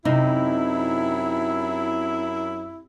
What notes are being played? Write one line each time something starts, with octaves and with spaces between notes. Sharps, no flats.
F#2 C3 D#4 E4